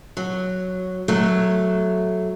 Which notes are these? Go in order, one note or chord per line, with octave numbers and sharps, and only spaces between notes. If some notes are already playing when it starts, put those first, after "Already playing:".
F#3
F#3 A3